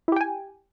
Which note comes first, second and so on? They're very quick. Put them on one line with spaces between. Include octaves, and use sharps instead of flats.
E4 G4 G5 G#5